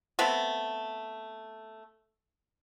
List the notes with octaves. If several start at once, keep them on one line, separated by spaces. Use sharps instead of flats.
A3 B3 C4